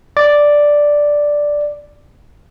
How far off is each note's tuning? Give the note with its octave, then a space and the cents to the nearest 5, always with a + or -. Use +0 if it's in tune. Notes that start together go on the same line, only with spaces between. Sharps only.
D5 +0